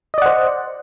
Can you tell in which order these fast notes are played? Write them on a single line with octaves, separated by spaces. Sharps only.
D#5 D5 F#5 C5